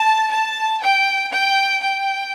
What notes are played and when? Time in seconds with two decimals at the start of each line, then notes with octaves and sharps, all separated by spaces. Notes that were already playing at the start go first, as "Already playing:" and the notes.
Already playing: A5
0.31 A5
0.82 G5
1.31 G5
1.81 G5